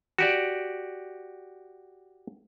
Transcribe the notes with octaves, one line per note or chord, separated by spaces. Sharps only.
F#4 G4 D5